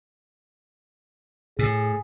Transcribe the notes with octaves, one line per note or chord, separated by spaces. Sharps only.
A2 G#4